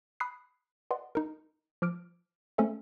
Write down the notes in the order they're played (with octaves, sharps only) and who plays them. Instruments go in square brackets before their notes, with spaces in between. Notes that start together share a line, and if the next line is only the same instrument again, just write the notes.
[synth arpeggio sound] B5 D#6 F#6 C7
B4 D5 D#5 F#5 C6
D#4 A#4
F3 D6 F6 D7
A3 C4 C#4 A4 C5 E5